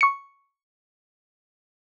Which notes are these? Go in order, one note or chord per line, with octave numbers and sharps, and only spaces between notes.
C#6 C#7